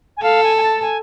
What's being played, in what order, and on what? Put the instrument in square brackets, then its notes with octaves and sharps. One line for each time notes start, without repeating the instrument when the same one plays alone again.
[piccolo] G#5
[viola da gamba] A4 [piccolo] F5
[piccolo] G#5
G#5
A5
G#5